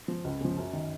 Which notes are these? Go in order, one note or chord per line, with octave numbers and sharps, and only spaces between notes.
F3
C#2
C#3 F3
F#2
D#3